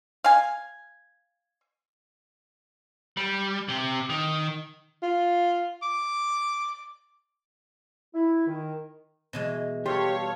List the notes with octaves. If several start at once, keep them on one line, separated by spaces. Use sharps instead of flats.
F5 G#5
G3
C3
D#3
F4
D6
E4
D#3
B2 E3 G#3
G3 G4 A4 C#5 F5 C6